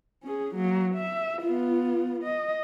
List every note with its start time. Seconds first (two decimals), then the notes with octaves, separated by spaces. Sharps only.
0.23 C#4 G#4
0.55 F#3 A#3
0.94 E5
1.42 B3 F4
2.23 D#5